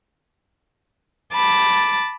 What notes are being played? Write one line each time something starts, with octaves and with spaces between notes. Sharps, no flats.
A5 B5 D6 A6